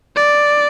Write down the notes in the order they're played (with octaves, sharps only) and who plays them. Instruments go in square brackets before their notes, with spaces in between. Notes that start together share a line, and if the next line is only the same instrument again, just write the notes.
[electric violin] D5